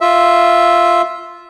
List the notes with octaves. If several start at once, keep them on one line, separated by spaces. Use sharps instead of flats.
F4 E5